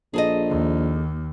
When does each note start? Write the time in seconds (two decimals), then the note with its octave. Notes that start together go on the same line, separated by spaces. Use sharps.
0.14 A#1 G#4 A4 D#5
0.50 D#2